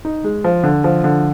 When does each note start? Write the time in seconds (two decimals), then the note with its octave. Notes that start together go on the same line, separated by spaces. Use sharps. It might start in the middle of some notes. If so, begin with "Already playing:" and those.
0.05 D#4
0.24 G#3
0.44 F3
0.63 D3
0.84 F3
1.04 D3